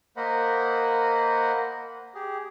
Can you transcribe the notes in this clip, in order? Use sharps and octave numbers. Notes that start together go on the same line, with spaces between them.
A#3 A#4 C5 D#5 F#5 B5
G4 G#4